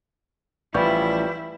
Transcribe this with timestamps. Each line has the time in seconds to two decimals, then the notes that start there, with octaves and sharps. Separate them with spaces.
0.74 A1 F3 G3 E4 B4 D5 C#6